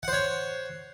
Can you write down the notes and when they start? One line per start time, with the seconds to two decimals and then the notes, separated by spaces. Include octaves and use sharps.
0.03 F#5
0.08 C5
0.13 C#5